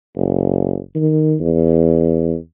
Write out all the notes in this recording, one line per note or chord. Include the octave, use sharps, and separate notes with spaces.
F#1
D#3
E2